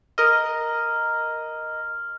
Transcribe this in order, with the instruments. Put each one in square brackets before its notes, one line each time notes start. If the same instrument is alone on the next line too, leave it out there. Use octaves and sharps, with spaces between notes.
[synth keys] A#4 D#5 [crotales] F6